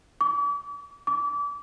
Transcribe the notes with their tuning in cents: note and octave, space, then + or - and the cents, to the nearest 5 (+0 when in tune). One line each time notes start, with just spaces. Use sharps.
D6 -40
D6 -30